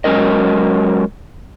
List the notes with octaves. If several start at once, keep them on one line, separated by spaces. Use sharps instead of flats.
F#3 G#3 C#4 A#4 D#5